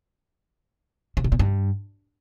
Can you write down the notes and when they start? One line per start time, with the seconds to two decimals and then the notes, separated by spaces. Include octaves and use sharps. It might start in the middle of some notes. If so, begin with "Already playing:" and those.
1.17 C#3
1.24 B2
1.32 A#2
1.39 G2